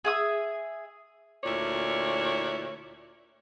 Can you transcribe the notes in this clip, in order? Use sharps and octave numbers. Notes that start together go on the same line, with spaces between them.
G#4 E5 D#6
D2 A#2 E4 C#5 D5